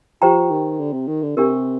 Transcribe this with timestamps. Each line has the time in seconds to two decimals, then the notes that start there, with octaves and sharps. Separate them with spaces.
0.22 F3 G4 C5 G5 A#5
0.50 D#3
0.79 D3
0.93 C3
1.08 D#3
1.23 D3
1.37 C3 D4 G4 A#4